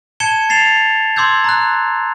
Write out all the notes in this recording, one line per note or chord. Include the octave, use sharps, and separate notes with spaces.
A5 G#6 C#7 E7 G7
A6 C7 E7 F7
C6 D6 E6 G6 G#6
A#5 F#6